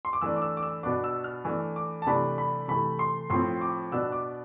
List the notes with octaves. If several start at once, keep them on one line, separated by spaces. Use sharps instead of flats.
C6
D6
E3 A3 D4 E6
D6
E6
D6
E6
B2 B3 D4 D6
E6
F6
E3 A3 D4 E6
D6
A5
C3 E3 A3 D4 B5
B5
C3 E3 A3 B5
C6
A2 F3 C4 C6
D6
B2 B3 D4 E6
D6